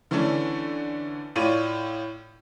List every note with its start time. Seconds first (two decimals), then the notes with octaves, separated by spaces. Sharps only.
0.11 D3 E3 A3 C#4 D4
1.36 A2 F4 C#5 D5 D#7